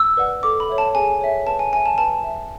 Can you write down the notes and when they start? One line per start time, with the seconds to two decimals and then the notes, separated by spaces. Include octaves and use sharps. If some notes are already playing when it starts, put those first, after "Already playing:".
Already playing: E6
0.17 B4 D5 F#5
0.43 A4 D6
0.60 B5
0.69 C#5 E5
0.78 A5
0.95 G#4 G#5
1.21 C#5 E5
1.46 B4 A5
1.59 G#5
1.73 E5 G#5
1.86 A5
1.98 B4 A5
2.24 E5